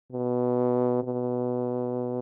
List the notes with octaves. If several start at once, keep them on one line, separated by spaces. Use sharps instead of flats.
B2
B2